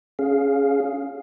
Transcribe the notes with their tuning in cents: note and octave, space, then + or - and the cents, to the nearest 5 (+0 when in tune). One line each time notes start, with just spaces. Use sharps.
C#4 +0 G#4 +10 F5 +5